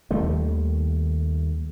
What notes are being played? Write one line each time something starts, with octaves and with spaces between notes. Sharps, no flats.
D#2 D#3 G3 A3